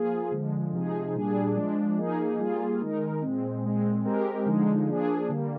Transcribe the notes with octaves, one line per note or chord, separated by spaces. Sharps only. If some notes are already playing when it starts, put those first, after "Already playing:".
Already playing: F3 A#3 F4 G#4
D3 F3 G#3
C3 F3 G#3 D#4 G#4
A#2 G3 D4 G#4
F3 G#3 D4
F3 A#3 D#4 G#4
G3 A#3 F4 G#4
D#3 G#3 D#4 A#4
A#2 G#3 C4
A#2 G#3 C4
G#3 C4 G4 A#4
D3 F3 G#3 D#4
F3 A#3 D4 G#4
D3 G3 A#3